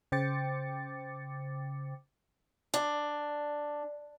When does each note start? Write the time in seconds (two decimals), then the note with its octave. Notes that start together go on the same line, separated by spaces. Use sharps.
0.12 C#3 C5 G5 D6 A6 C#7
2.74 D4